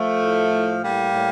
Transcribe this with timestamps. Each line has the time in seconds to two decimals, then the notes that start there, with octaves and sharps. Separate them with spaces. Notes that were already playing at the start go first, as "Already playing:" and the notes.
Already playing: F3 A3
0.22 A2
0.52 A2
0.83 A2 G3 A#3
1.14 A2